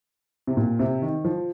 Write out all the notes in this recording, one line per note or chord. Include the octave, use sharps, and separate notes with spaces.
C3
A#2
C3
D#3
F3